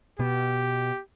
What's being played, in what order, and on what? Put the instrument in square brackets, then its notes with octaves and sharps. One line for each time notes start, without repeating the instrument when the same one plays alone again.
[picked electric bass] B2 B3 [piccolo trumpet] G4